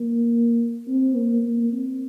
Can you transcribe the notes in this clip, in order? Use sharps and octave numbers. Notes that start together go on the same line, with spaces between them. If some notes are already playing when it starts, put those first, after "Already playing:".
Already playing: A#3
C4
A#3
A#3
C4